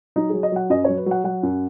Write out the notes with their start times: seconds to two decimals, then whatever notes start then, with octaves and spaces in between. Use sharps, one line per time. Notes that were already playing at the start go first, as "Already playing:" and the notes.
0.16 F#3 D#4
0.30 F#3 G#4
0.43 D#5
0.52 F#3 F#5
0.70 F#2 D#5
0.85 F#3 C#5
0.97 B4
1.06 F#3
1.11 F#5
1.24 F#3 F#5
1.43 F#2